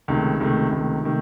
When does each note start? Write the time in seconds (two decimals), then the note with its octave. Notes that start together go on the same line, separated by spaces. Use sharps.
0.08 C#2 C3 D#3 A3
0.40 C#2 C3 D#3 A3
0.71 C#2 C3 D#3 A3
1.03 C3 D#3 A3